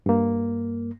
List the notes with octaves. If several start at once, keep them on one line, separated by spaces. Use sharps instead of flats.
G2 A#3